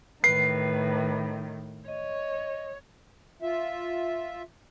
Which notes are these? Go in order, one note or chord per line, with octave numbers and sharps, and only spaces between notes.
A2 D#3 B4 C7
C#5 D#5
F4 E5